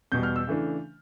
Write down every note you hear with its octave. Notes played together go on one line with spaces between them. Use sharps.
E2 B2 G3 G6
F6
E6
C#3 E3 A3 D4